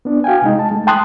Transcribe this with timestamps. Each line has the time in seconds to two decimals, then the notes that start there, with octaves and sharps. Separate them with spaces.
0.05 B3 D4
0.24 F#4 F5 G5 G#5
0.42 C3 G#3 D#4
0.59 A5
0.71 G#3 A3
0.87 G5 A5 C6 D#6 F#6